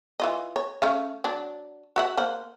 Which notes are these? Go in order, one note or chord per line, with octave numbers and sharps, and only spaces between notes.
E3 F4 D#5
C#5
A3 C#4 F5
F#3 D4
F#4 E5 F#5
A#3 C5 F#5